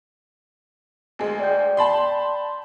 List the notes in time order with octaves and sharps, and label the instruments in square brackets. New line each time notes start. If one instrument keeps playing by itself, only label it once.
[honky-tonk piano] D2 G#3
[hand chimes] D5 G5 G6
[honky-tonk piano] A5 B5 C6